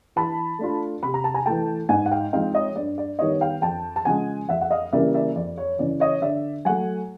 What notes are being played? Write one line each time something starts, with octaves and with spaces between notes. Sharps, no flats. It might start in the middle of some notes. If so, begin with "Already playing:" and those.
E3 A5 B5
A3 D4 F4
C3 B5
A#5
A5
G#5 A#5
E3 A3 G5 A5
G#2 F#5 G#5
F#5
F5 G5
F3 G#3 C4 D#4 F5 G5
C#5 D#5
G2 D5
D5
D#3 G3 B3 C#5 D#5
F5 G5
F2 G5 A5
A5
C#3 F3 G#3 F#5 G#5
F2 E5 F#5
F#5
D#5 F5
C#3 E3 G3 A#3 D5 E5
D5 E5
F2 D5
C#5
C#3 E3 D5
C#5 D#5
D3 D5 E5
F#3 A3 F#5 G#5